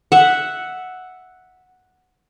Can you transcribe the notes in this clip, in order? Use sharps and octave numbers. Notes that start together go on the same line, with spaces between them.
E5 F#5